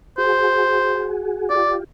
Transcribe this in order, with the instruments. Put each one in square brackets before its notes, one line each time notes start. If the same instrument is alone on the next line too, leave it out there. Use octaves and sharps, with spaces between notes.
[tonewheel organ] F#4 G#4 [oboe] C5
[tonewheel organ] F4 G4 [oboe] D5